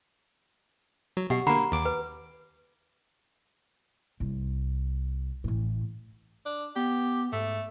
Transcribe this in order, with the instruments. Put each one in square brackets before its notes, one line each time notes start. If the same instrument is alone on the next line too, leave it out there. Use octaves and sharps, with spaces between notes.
[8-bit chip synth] F#3
[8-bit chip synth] B2 [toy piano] G4 F#5
[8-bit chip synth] D3 A#3 [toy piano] F#5 A#5 B5
[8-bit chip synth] D#2 D6
[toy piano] B4
[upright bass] C2
A1 A2
[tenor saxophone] D4
[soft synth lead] B3 [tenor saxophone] G4
[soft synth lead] G#2 [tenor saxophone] A3